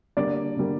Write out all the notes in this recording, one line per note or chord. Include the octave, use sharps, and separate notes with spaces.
D3 G3 A#3 D5
D3 G3 A#3